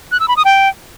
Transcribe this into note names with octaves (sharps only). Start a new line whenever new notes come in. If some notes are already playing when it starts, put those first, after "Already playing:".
F#6
E6
B5
D#6
G5